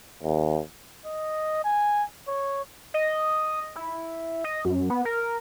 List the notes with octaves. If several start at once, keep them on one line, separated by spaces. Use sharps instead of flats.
D#2
D#5
G#5
C#5
D#5
E4
D#5
F#2
B3
A#4